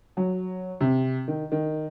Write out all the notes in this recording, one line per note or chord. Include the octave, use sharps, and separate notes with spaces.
F#3
C3
D#3
D#3